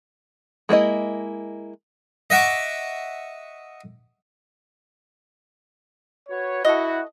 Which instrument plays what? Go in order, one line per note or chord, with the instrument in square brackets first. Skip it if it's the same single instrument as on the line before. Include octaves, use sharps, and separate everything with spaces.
[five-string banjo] G#3 A#3 E4 D#5
[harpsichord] D#5 E5 F#5 C#6 D6
[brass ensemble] F#4 B4 C#5
[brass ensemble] E4 F#4 [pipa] A4 D#5